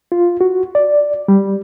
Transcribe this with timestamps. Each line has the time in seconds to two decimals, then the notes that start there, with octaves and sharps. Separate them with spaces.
0.12 F4
0.41 F#4
0.75 D5
1.28 G3